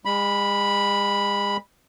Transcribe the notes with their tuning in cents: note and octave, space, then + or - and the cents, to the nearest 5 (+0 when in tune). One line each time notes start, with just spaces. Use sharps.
G#3 -40 B5 -5